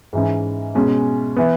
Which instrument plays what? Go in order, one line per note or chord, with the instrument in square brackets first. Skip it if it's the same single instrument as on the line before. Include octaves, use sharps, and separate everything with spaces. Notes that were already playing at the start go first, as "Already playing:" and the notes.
[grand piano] G#2 E3 C#4
B2 G#3 C#4
E3 B3